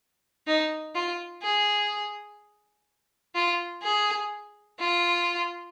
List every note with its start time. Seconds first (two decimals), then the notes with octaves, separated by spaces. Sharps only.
0.47 D#4
0.95 F4
1.42 G#4
3.35 F4
3.83 G#4
4.79 F4